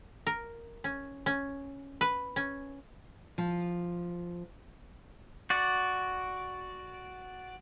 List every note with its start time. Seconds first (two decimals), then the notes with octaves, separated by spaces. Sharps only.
0.27 A#4
0.84 C#4
1.26 C#4
2.01 B4
2.36 C#4
3.38 F3
5.50 F#4 D5